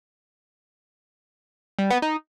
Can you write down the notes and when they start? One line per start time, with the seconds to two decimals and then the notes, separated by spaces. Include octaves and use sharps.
1.79 G3
1.90 B3
2.02 D#4